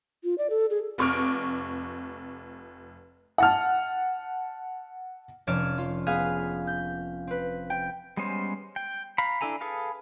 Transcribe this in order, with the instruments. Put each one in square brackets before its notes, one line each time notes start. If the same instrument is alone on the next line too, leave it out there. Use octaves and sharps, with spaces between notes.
[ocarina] F4
D5
A4
G#4
[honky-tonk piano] F1 F2 C#6 D6 F6 D7
[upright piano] F#5 A5 F6
[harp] F1 C#4 C#5 D5 F6 E7
F4
B3 G#4 F5
G6
C4 B4
G5
[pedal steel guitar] G3 G#3 B3 C#4 C5
G5
F5 A#5 B5
D4 E4 A4 G#5 A#5
G#4 A4 B4 F5